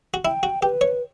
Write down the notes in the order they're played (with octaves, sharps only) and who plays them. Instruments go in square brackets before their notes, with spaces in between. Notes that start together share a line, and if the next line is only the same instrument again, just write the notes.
[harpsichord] F#4
[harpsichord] E4 [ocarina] G5
[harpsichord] F#4
[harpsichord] G4 [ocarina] B4
[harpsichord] C#5